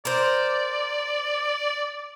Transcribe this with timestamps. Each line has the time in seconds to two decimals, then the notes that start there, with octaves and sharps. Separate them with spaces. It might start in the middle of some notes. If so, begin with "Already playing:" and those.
0.05 A#4 C5 D5